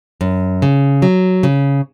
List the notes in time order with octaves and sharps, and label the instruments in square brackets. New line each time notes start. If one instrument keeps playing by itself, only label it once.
[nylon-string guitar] F#2
C#3
F#3
C#3